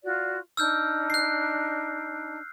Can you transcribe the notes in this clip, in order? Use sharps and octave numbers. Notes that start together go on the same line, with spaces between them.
F4 F#4 D5
D4 D#4 E6 F6 G6
F#6 C7